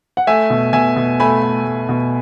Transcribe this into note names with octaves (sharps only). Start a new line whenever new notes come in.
F#5
A3 E5 G#5
B2
B2 E5 G#5
B2
A3 G#5 B5
A3
A3
B2